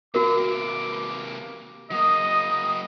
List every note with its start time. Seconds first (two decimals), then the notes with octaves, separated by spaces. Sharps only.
0.15 C3 A#3 F#4 A#4 D6
1.91 F#3 A#3 D#5 D#6